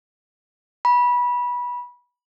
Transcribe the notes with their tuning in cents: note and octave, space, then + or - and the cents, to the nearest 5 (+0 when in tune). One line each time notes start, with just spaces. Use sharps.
B5 -20